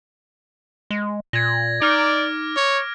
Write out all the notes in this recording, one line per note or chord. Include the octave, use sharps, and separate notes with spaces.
G#3
A#2 G#6 A#6
D#4 D5 D6 F6 D7
C#5